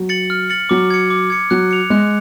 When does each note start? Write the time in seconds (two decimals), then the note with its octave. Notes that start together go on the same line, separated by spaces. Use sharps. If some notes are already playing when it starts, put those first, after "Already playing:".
Already playing: F#3
0.09 A6 C#7 F#7
0.30 F6
0.50 A6 C#7 F#7
0.69 F#3 D6
0.90 G#6 C#7
1.10 D6
1.30 G#6 C#7
1.51 F#3 F#6
1.71 C#7 F7
1.90 G#3 F#6